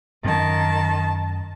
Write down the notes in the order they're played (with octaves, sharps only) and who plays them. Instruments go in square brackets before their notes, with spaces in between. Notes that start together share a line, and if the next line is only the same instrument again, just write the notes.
[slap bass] F#2 [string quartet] D#3 A5